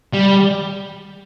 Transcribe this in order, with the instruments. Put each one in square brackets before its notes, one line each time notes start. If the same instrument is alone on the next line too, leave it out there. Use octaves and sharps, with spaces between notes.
[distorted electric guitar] G3